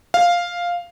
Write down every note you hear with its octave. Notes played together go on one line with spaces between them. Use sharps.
F5